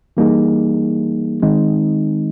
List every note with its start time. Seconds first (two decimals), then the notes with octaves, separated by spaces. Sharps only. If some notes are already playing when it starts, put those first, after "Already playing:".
0.17 E3 G3 A#3 D#4 G#4
1.42 D#3 G#3 C4 D#4